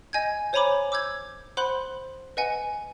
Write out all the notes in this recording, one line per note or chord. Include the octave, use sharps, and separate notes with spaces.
D#5 G#5 G6 G#6
C5 C#5 G#5 A#5 B5 D6
D6 E6 G6 G#6
C5 F#5 B5 C6 F#6 F#7
B4 D#5 F#5 G#5